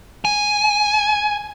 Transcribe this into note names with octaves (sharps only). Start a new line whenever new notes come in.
G#5